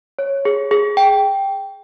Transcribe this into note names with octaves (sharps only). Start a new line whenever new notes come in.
C#5
G#4
G#4
G5